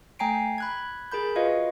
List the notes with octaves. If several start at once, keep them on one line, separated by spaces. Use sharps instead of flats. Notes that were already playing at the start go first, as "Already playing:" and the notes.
A3 G5 G#5 A#5 C7 D7
B5 F#6 G#6
G#4 A#4 B5 G6
F4 F#4 B4 D#5 F5